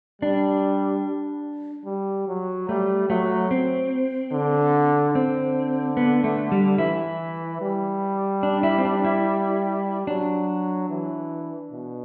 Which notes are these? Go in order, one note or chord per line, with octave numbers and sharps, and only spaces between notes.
G3 D4
G3
F#3
G3 A3
F#3 A3
C4
D3
D3 C4
B3
A3
G3
E3 E4
G3
D4
E4
C4
D4
E4
F#3 D4
E3
B2